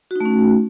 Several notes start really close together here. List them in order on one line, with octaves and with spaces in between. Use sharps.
F#4 D#4 A3 C#4